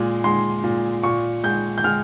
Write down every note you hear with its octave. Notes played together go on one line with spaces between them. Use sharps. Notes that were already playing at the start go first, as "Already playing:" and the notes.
Already playing: A#2 G#3
G#3 C6
A#2
A#2 C#6
G#3 G6
G6
G#3 F6